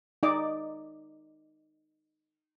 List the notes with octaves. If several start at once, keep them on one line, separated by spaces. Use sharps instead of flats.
D#4 D5 D#5 D6